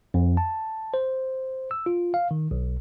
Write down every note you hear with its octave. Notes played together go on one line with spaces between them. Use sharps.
F2
A5
C5
E6
F4
F5
D#3
B1